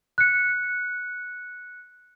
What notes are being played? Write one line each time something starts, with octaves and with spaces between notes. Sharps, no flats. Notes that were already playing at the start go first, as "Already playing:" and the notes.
F#6 C#7